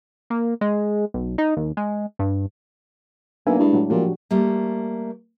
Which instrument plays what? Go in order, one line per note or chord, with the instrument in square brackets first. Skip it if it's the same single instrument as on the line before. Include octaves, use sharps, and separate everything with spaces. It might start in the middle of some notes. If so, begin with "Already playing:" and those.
[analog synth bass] A#3
G#3
B1
D#4
D#2
G#3
G2
[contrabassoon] B1 [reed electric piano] A#3 [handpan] D4 [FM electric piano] B4 E5 G#5
[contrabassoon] G2 [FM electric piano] G#3 E4
[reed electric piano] A2 F#3
[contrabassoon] A#2 [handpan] F3 F#4 G4
[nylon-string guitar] G3 A3 A#3